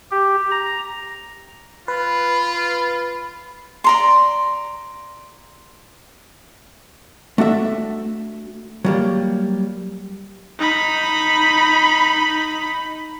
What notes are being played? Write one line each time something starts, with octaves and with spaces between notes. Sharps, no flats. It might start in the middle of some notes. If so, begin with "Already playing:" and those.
G4
A#5
F4 B4 B5
D5 A#5 C6
A3 D4 F#4 E5
F#3 G3 A#3
D#4 B5